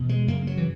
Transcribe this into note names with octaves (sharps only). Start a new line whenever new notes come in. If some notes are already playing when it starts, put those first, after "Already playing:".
Already playing: E2 B2
G#3
F#2 C#3 A#3
F#3
E3